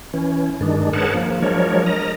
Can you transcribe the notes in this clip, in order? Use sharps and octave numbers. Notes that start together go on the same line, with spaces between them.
E3 C#4
G2 D#3 G#3 D4
G#4 A#4 B4 C#5 F#5 A5
F3 A#3
F3 F#3 G#3 D4 A#4 C#5
A#4 D#5 A#5